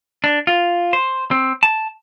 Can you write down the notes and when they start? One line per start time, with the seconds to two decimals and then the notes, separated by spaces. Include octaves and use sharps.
0.24 D4
0.47 F4
0.93 C5
1.31 C4
1.63 A5